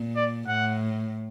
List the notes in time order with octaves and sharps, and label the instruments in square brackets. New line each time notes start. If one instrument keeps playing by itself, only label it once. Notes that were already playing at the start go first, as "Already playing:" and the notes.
Already playing: [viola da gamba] A#2
[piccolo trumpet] D5
[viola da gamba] A2 [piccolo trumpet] F#5